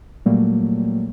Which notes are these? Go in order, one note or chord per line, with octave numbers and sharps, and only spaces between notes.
A#2 F#3 G3 A3 A#3